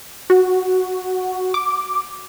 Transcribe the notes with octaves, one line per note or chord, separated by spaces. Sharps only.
F#4
D6